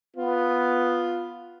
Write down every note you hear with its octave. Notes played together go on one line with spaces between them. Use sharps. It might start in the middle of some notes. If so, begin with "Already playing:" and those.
B3 F4